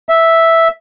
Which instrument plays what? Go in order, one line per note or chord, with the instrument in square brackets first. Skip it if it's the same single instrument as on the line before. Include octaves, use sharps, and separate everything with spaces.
[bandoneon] E5